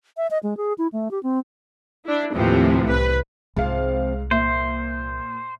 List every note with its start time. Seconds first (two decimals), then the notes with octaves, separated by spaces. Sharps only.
0.17 E5
0.31 D#5
0.43 G#3
0.57 G#4
0.78 E4
0.92 A3
1.11 G4
1.23 C4
2.05 D4 E4
2.34 D#2 A2 C3 E3 F3
2.87 C2 B4
3.56 C2 G#2 C3 F3 G3 F5
4.31 A#2 C5 E5